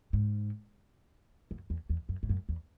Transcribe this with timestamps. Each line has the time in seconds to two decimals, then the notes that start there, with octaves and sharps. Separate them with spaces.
0.13 G#2
1.51 F#2
1.70 E2
1.90 E2
2.09 F#2
2.23 G#2
2.29 F#2
2.49 E2